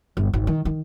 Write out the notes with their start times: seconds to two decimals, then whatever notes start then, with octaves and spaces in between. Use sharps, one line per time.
0.17 G1
0.34 G#1
0.47 D#3
0.65 D#3